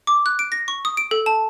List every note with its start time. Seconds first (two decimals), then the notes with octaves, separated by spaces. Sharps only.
0.07 D6
0.26 F#6
0.39 D7
0.52 A#6
0.68 C#6
0.85 D#6
0.97 D7
1.11 A4
1.26 A5